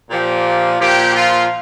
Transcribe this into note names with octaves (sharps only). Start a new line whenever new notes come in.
A#2 F3 G4
A#2 F3 G4
F4